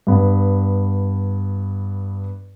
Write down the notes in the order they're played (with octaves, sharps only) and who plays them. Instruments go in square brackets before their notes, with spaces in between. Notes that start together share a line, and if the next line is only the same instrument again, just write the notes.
[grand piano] G2 B3